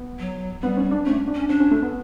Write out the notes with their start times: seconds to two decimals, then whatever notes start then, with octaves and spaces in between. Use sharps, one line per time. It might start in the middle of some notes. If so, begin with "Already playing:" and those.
Already playing: B3
0.19 F#3
0.62 G3 B3
0.77 C#4
0.91 D4
1.06 A3 C#4
1.28 D4
1.35 C#4
1.49 C#4 D4
1.60 C#4
1.71 A3
1.82 B3